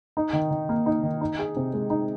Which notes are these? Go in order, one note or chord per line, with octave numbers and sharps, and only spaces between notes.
D#4
D#3
D#3
A#3
D#4
D#3
D#4
G#4
C3
G#3
D#4